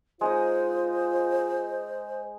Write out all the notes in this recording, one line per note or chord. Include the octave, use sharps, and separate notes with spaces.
G#3 D#4 F4 C5 D#5